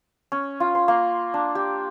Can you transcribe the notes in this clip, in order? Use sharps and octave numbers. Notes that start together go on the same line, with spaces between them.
C#4
F4
C6
A#3
D4
G4